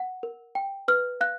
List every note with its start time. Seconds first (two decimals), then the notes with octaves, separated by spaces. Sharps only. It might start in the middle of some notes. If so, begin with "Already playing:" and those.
Already playing: F#5
0.23 A#4
0.55 G5
0.88 B4 F6
1.21 F5 F#6